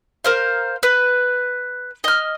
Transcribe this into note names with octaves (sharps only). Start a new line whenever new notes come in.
A#4 C5 F5
B4
D#5 F6